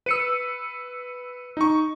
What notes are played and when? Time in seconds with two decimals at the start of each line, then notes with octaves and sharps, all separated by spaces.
0.06 B4 E6 C#7 D#7
1.57 D#4 C#6